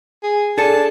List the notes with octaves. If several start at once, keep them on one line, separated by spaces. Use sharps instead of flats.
G#4
D4 G#4 A4 A5